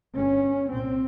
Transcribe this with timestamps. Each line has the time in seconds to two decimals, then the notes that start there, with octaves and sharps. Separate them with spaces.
0.16 G1 G2 C#4
0.69 C2 A#2 C4